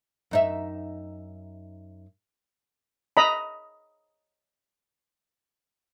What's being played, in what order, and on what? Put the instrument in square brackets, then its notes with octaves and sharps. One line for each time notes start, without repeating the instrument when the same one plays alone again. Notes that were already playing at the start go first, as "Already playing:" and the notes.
[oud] F#2 D#4 E5
[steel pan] D#5 A#5 B5